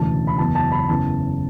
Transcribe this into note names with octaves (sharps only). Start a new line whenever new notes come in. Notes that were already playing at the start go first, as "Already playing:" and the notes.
Already playing: E1 D2 C#3 E3 A5
B5
F#1 E2 B2 A5
A5
B5
F#1 E2 C#3 E3 A5